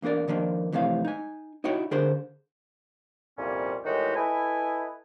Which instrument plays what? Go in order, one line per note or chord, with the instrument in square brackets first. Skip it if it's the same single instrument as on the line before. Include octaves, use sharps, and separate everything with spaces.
[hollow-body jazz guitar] E2 A#3 D4 A#4 D5
D#3 F3 A#3 D4
F2 A2 C3 E3 F5
D#4 G#5
D#4 E4 F#4 C#5 G5
D3 D4 G#4 A#4 C5
[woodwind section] C2 F2 A#2 G3 C#4 G#5
A2 D#3 E3 G#3 F#4 G4
E4 A4 B4 D#5 G#5